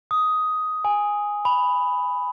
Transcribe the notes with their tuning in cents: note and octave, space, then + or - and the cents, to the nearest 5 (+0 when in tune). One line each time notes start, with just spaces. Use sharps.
D#6 +10
G#5 -10
B5 +5